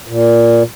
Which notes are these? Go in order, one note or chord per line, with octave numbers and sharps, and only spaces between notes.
A#2